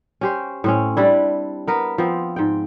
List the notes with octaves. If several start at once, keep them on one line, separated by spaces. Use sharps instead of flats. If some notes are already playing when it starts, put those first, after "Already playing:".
C#4 G4 C5
A2 C4 C#4
G3 D4 E4
B3 A#4 B4
F3 B3 C4
G#2 G5